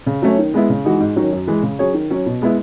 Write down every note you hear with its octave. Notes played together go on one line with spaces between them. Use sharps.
C#3
F#3 A3 C#4
D#3
G#3 B3 E4
C#3
E3 G#3 D#4 F#4
G#2
D#3 F#3 C#4
F#2
E3 G#3
C#3
F#3 C#4 G#4 C#5
D#3
F#3 C#4
B2
G#3 B3 E4